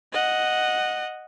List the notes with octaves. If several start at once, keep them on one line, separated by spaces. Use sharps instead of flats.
D#5 F#5